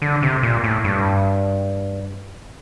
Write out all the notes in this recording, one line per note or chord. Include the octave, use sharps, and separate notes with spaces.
D3
C3
A#2
A2
G2